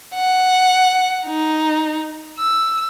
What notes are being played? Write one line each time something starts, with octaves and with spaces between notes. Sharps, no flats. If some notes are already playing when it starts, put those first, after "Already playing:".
F#5
D#4
E6